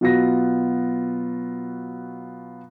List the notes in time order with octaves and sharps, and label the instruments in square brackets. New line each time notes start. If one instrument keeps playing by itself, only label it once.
[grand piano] B2 F#3 B3 F4 F#5 A#6